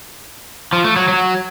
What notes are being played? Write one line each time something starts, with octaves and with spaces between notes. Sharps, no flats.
F3
A3
F#3
F#3